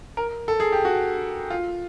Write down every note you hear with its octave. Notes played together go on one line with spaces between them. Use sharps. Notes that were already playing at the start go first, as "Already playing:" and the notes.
A#4
A4
G#4
G4
F#4
F4